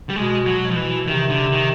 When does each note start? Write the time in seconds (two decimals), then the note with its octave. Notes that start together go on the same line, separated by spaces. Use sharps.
0.09 G3
0.16 B2 G#3
0.46 F#3
0.61 B2
0.71 F3
0.76 E3
1.07 C3 D#3
1.30 D3
1.52 D#3